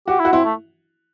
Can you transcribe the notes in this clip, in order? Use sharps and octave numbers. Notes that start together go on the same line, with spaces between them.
F#4 G4
E4
F#4
C4 E4
A3